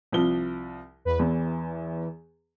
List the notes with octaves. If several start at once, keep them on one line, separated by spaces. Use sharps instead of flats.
C2 F3 G7
E2 B4
E2 E3